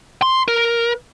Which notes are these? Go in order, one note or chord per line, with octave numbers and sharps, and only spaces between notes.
C6
A#4